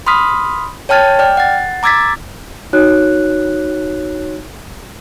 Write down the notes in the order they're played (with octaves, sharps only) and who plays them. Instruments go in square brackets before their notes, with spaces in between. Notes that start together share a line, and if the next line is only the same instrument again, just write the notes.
[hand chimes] B5 C6 D#6 F6 B6
C#5 G5 A5 F6 G#6 A6
D5 G5 F6
F#5 A6
A#5 D6 E6 G#6 A6 B6
[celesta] D#4 F#4 C#5 F#6